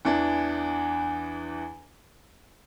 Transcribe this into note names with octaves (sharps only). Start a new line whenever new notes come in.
E2 E3 D4